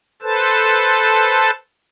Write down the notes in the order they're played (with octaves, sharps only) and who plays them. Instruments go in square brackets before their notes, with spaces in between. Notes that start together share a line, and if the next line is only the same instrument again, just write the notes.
[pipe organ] A4 B4 C5 A5